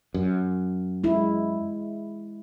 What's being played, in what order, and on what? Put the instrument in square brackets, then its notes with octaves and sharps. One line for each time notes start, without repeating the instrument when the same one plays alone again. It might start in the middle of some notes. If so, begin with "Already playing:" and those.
[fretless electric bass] F#2
[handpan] G#3 E4